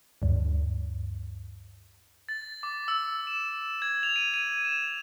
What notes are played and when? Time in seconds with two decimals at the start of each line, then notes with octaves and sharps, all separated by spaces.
0.22 D2 G2
2.29 A6
2.63 D6
2.88 E6
3.27 E7
3.82 G#6
4.03 F7
4.16 D#7
4.34 D#7
4.65 E7